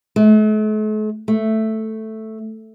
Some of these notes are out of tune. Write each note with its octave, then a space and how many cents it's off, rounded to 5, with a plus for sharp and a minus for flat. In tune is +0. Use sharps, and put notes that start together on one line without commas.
A3 -45
A3 +0